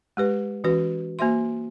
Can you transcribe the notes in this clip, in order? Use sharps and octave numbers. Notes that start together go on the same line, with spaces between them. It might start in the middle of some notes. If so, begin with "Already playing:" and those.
G#3 G4 B4
E3 C#4 F#4 B4
A#3 F#4 C5 E5 C6